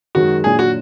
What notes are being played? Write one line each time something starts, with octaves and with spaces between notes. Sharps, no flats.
F#2 D#3 G#3 F#4
A#2 F#3 D4 G#4
F#4